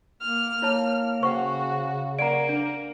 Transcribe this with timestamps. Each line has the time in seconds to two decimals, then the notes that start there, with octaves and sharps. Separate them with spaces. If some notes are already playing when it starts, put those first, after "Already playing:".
0.21 A#3 F6
0.62 A#3 E4 C#5 A5
1.23 C#3 F#4 C5 F#5 G5 C#6
2.19 A#3 D5 F#5 A#5 D7
2.49 D4